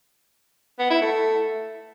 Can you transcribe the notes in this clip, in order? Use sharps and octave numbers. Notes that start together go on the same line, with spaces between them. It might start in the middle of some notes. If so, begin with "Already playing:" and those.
B3
E4
A3